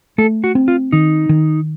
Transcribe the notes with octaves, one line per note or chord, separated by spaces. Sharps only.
A3 A4
F#4
C4
F4
D#3 D#4
D#3